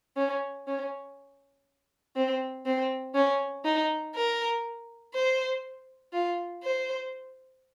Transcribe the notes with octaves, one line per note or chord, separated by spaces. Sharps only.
C#4
C#4
C4
C4
C#4
D#4
A#4
C5
F4
C5